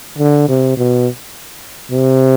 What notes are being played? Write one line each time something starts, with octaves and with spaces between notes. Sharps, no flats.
D3
C3
B2
C3